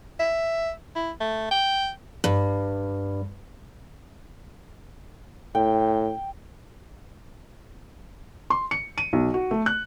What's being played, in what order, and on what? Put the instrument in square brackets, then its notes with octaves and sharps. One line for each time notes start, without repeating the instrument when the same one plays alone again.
[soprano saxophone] E5
E4
A3
G5
[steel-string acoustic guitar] G2
[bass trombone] A2 [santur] G5
[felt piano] C6
C#7
D#7
B1
F#4
A3
F#6